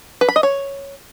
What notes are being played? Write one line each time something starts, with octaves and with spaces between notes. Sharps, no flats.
B4
B5
D#5
C#5